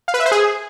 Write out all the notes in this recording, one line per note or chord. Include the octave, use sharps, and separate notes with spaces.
F5
B4
E5
C5
G#4